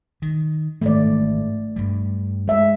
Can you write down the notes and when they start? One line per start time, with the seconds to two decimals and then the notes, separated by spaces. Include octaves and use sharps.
0.22 D#3
0.81 G#2 D#3 E3 A3 D5
1.76 G2 G3
2.48 G#3 E5